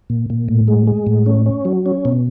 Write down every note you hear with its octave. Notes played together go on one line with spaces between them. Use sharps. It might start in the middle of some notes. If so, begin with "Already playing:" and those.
A#2
A#2
A2
G#3
G#3
A2
C#4
C#4
F#3
C#4
B2